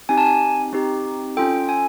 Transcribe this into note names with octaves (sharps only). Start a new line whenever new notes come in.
C4 D#4 G4 G#5
A5
G#5
C4 D#4 G4
C#4 F4 A4 G5
G#5